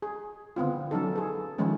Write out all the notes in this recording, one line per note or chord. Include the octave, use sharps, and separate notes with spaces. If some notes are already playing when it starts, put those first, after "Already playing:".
G#4
D3 B3 C4 F4
F#3 C#4 D#4 A4
G#4 A4 B4
D#3 F3 G#3 A3 C#4